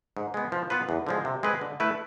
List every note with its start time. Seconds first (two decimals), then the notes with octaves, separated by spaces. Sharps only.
0.17 G#2
0.34 G#3 B3
0.52 F3
0.70 B3 F4 B4
0.89 E2
1.07 D3 F3 G#3
1.25 C3
1.43 G#3 C4 G#4 B4
1.61 D3
1.80 A3 E4 B4